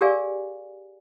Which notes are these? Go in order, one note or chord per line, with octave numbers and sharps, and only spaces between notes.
G4 G#4 A#4 D5 F5 G#5